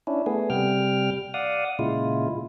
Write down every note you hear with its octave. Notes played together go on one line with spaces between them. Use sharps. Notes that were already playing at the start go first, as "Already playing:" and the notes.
C#4 D4 E4
A3 B3 G#4
C3 G3 G5 F6
D5 F5 F#5 D#6
A#2 C#3 G#3 E4 F4